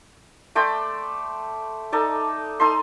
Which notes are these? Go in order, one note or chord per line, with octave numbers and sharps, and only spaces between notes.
A3 D5 G5 C6
D#4 A4 D5
D#4 A4 C6